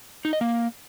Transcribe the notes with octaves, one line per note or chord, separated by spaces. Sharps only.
D#4
D#5
A#3